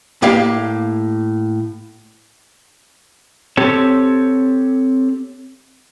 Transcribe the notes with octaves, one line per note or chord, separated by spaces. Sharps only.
A2 A#3 G4 E5 F5
C4 G4 A4 C#5